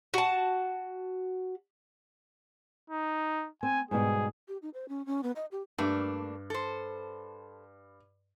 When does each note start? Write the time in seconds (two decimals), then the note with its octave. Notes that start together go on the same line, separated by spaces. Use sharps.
0.14 F#4 A5
2.90 D#4
3.63 C4 G#5
3.91 G#2 B2 G3 G#4
4.48 G4
4.62 D#4
4.74 C5
4.88 C#4
5.06 C#4
5.23 B3
5.36 D#5
5.51 G4
5.78 G2 A3 A#3 D4
6.50 A4 C5